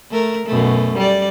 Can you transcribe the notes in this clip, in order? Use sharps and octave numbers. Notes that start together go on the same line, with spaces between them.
A3 A#4
F#2 B2 A3
G3 D5